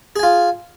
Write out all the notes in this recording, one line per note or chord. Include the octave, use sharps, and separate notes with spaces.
F4 G#4 G#5